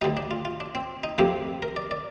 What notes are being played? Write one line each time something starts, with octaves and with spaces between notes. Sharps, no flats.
D2 D3 G3 D#4
D4
F4
F4
D4
C4
D#4
F2 C3 F3 A#3 G4
A#4
D5
D5